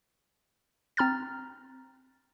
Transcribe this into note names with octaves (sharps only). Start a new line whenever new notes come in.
C4 A#5 F6 A6